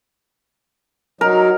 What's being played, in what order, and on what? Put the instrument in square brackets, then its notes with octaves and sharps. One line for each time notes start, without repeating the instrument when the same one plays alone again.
[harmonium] F#3 D#4 [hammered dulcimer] A#4